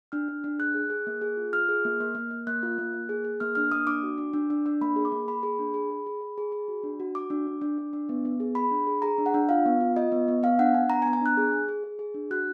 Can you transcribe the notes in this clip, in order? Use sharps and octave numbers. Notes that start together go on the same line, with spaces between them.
D4 F6
D4
D4
G#4 F#6
G#4
G#4
A#3
G#4
F4
F4 F6
G#4
A#3
A#3
A#3
A#3
A#3 F#6
F4
A#3
A#3
G#4
G#4
A#3 F6
D4 F6
A#3 D#6
D4 D6
F#4
D4
D4
D4
D4
A#3 B5
G#4
D6
A#3
A#3 B5
G#4
D4
G#4
G#4
G#4
G#4
G#4
G#4
F#4
D4
F#4
F#4 D6
D4
D4
D4
D4
D4
B3
B3
G#4
G#4 B5
D4
G#4
G#4 A#5
D4
F#5
D4
F4 F5
B3
F4
F4 D#5
B3
B3
B3 F5
D4 F#5
D4 G#5
B3 A#5
G#5
B3 A#5
G#5
D4 F#6
G#4
G#4
G#4
G#4
G#4
D4
F#4 F#6